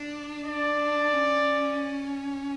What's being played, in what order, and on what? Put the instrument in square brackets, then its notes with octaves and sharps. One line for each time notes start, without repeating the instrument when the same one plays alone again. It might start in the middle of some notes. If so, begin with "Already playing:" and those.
Already playing: [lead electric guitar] D4
[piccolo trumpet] D5
[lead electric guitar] C#4